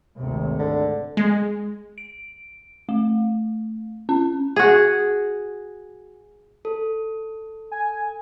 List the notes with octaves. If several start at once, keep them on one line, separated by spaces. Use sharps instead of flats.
G#1 D2 C3
D3
G#3
D7
A3
C#4
F#4 G#4
A4
G#5